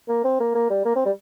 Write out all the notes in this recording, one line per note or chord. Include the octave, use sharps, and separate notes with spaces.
A#3
C4
A#3
A#3
G3
A#3
C4
G3